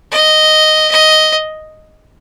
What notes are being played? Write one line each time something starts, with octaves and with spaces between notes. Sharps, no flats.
D#5
D#5